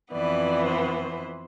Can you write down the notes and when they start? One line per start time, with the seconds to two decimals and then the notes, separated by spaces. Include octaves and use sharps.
0.11 F2 E3 B3 D5
0.65 C5